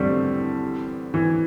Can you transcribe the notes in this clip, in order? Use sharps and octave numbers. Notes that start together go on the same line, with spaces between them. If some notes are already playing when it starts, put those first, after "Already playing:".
Already playing: E2 D3 G3 A3 C4
E3